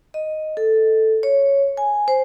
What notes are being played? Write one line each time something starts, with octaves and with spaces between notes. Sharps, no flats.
D#5
A4
C#5
G#5
C5